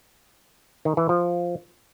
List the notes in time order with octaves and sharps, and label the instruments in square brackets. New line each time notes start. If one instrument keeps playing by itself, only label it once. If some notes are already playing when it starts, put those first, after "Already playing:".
[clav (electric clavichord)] D#3
E3
F3